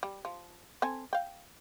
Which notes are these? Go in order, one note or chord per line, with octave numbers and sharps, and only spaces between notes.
G3
F3
C4 A4 G#5
F5 G5